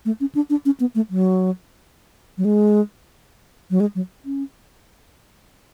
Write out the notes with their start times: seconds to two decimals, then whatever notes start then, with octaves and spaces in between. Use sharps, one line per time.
0.05 A3
0.20 C#4
0.35 D4
0.50 D4
0.65 C#4
0.80 B3
0.95 A3
1.10 F#3
2.38 F#3
2.45 G#3
3.71 F#3
3.80 G#3
3.95 F#3
4.25 C#4